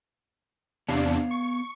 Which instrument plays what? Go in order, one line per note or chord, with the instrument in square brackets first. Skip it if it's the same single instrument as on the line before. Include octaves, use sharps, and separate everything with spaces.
[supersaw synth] E2 C3 D4 [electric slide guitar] B3 C#5 F5
[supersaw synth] C#6